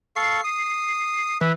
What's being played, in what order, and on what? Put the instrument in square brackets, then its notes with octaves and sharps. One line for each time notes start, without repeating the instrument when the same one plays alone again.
[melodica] A4 F5 C#6 [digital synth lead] C7
[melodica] D#6
[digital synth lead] E3 [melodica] B4 E5